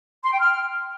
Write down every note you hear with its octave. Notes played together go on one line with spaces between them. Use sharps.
C6
G5
F6